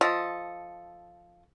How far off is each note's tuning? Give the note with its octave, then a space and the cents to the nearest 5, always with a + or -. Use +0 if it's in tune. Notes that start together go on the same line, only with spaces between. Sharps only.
F3 +0 A4 +0 D#5 +0